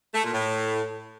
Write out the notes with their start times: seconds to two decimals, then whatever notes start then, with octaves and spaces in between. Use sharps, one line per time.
0.14 A3
0.24 A#2
0.33 A2